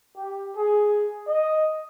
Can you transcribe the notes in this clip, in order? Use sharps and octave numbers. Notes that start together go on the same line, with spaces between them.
G4
G#4
D#5